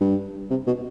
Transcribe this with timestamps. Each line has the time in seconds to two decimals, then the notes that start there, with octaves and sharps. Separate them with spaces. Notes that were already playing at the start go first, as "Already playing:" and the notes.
0.01 G2
0.50 C3
0.66 B2